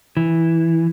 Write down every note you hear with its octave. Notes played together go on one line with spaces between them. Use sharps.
E3